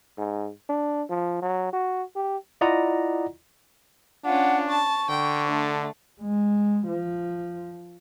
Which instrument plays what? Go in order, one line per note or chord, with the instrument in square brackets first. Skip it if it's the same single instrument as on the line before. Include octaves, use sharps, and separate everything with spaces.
[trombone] G#2
D4
F3
F#3
F#4
G4
[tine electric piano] E4 F4 D5 D#5 F#5 A#5
[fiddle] C#4 F4 [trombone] D4 [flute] F#5
[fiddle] A5 [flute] C#6
[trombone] D3 [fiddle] G5
[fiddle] A3 D4
[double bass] G#3
F3